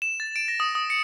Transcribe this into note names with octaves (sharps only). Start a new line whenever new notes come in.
E7
A6
D7
A#6
D#6
D#6
C#7